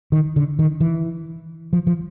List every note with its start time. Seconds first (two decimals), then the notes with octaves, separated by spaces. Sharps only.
0.12 D#3
0.36 D3
0.59 D#3
0.80 E3
1.73 F3
1.87 F3